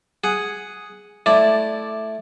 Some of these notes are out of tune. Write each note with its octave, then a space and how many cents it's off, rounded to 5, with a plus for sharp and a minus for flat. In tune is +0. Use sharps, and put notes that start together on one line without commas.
G#4 +0 F#5 +0
A3 -5 E4 +0 D5 +5